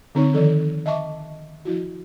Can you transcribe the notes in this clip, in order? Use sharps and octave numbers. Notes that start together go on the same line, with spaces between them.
D3 C4 D#4 C#5 C#6
D#3 F3 A4
D#5 E5 A5 C#6 D6
F3 E4 F#4